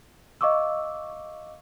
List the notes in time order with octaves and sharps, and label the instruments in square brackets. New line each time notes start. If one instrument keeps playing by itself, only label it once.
[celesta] D#5 F5 C#6 D6 E6